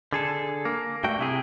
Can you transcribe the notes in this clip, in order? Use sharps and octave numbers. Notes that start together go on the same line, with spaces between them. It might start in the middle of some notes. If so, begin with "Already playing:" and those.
D3 G#4 A4
A#3
G2 A3 F#4 G5
C3 E4 G#4